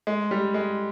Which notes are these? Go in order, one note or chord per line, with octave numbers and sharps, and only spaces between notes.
G#3
G3
G#3